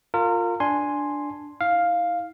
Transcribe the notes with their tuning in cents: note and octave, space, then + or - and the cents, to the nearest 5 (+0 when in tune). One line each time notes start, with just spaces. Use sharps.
F4 +10 A#4 -30
D4 +0 G#5 +0 C6 +5
E4 -40 F5 +5